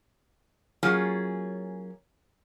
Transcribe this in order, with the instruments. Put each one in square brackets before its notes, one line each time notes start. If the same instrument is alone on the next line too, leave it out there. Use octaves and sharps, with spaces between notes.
[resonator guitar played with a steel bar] F#3 A#3 C#4 F4 G#4